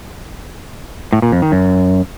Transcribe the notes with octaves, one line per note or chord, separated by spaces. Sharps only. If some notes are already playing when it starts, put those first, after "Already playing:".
A2
A#2
F2
D#3
F#2